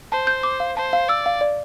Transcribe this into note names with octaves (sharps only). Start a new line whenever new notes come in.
C5 A5
G6
D6
F5
C5 A5
F5
D5 E6
F5
D5